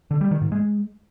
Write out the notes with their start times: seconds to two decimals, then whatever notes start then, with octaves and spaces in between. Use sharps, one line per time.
0.11 D3
0.21 G3
0.31 D#3
0.41 G#2
0.52 G#3